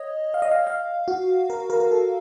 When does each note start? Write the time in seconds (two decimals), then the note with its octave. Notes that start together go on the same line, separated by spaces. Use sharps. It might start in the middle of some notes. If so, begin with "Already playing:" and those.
Already playing: C#5 D#5
0.34 F5
0.42 D#5
0.51 F5
0.67 F5
1.08 F#4
1.50 A#4
1.70 A#4
1.80 A#4
1.91 A4